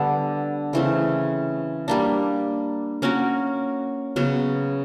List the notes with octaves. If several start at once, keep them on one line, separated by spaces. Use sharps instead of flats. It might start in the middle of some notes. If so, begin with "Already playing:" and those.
Already playing: D3 G3 B3 D4
C#3 E3 A3 C4
G3 A#3 D4
A#3 C#4 F#4 A#4
C#3 F#3 B3